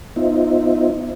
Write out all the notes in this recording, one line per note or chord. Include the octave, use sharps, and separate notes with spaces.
B3 D#4 F4 C5 D#5 E5